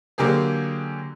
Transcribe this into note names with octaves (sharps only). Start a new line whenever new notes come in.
D3 F#3 A#3 G4 G#4